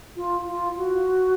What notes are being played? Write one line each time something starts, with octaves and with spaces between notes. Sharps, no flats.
F4
F4
F#4